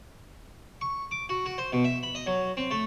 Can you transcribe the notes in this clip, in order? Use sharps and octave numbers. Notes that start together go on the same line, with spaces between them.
C#6
D6
F#4
F#4
C5
B2
E5
B5
D#5
F#3
C4
A3